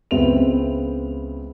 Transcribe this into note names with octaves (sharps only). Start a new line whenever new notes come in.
C#2 B3 C4 E5 F7